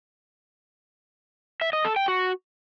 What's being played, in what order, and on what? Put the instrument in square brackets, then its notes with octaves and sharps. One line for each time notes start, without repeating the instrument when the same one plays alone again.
[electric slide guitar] E5
D#5
A4
G5
F#4